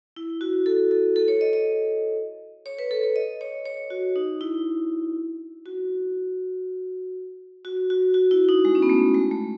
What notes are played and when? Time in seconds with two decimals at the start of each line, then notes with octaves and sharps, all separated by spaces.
0.16 E4
0.41 F#4
0.66 A4
0.91 A4
1.16 A4
1.28 C#5
1.41 D#5
1.53 D#5
2.66 C#5
2.79 B4
2.91 A4
3.03 C#5
3.16 D#5
3.41 C#5
3.66 C#5
3.90 F#4
4.16 D#4
4.41 E4
5.66 F#4
7.65 F#4
7.90 F#4
8.14 F#4
8.31 E4
8.49 D#4
8.65 G#3
8.75 C#4
8.82 B3
8.89 A3
9.14 G#3
9.31 A3